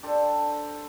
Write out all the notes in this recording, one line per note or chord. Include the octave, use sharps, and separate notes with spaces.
D4 G4 A4 C5